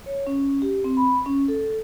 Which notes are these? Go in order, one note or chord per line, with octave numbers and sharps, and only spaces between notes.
C#5
C#4
G4
C4
B5
C#4
A4